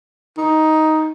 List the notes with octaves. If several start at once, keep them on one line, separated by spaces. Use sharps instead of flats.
D#4